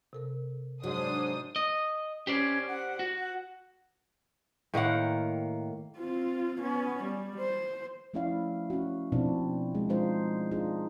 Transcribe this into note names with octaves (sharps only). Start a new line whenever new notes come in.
C3 A4 A#4
G#2 F#3 D4 C5 D#6
D#5
C#4 G4 C5 D5
F#5
F#4
F#5
A2 D#3 A#3 F#5
C4 F4
B3 C#4
G3
C5
F3 A3 C#4 E4 D5 F5
C#4 F#4
B2 F3 C4 D4 E4
G#3
F3 G#3 D4 D#4 F4 C5
D4 D#4 F4 G#4